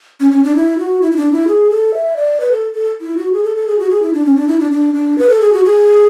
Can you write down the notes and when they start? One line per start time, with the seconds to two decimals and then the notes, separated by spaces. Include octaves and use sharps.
0.20 C#4
0.31 C#4
0.44 D4
0.56 E4
0.78 F#4
1.02 E4
1.12 E4
1.17 D4
1.32 E4
1.48 G#4
1.71 A4
1.94 E5
2.17 D5
2.40 B4
2.51 A4
2.75 A4
3.01 E4
3.17 F#4
3.33 G#4
3.44 A4
3.56 A4
3.68 G#4
3.79 F#4
3.90 G#4
4.02 E4
4.13 D4
4.26 C#4
4.36 D4
4.48 E4
4.60 D4
4.72 D4
4.94 D4
5.18 B4
5.29 A4
5.41 G#4
5.53 F#4
5.65 G#4